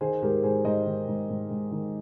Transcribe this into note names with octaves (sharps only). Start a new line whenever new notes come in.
D#3 G#4 C5
G#2 G4 A#4
G#2 G#4 C5
G#2 C5 D#5
D#3
G#2
G#2
G#2
D#3